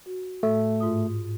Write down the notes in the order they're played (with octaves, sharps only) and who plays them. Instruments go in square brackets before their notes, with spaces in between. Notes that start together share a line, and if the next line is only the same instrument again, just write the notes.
[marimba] F#4
[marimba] A2 [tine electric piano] A3
[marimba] G#2 F4 D#6